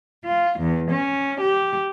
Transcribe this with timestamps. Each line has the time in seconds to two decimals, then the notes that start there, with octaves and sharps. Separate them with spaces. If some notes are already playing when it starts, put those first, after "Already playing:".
0.24 F4
0.59 E2
0.91 C#4
1.39 G4